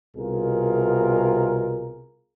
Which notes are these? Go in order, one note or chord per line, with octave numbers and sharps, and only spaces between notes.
C2 B2 F4 G#4 A#4